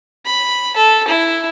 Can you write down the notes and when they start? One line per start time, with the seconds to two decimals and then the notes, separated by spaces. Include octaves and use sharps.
0.26 B5
0.77 A4
1.08 E4